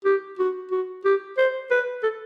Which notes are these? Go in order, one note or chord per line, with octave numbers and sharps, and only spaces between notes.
G4
F#4
F#4
G4
C5
B4
A4